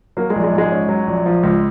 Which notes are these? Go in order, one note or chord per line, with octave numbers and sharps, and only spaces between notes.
F#3 A#3
G#3
A#1
G#3
G#2
G#3
C#4
F#3
A#1
F3
C#2